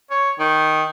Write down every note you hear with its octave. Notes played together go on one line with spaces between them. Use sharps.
C#5
D#3